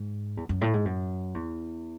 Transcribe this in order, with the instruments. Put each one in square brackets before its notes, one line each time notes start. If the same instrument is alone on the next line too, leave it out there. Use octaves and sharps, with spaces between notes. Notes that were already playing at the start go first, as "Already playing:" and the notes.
Already playing: [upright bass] G#2
E2
F#2
A2
G#2
F#2
E2